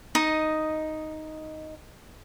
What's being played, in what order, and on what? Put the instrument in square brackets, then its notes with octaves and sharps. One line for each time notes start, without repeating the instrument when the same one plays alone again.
[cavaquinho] D#4 D#5